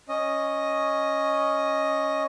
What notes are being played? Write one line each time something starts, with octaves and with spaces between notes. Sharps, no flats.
C#4 D#5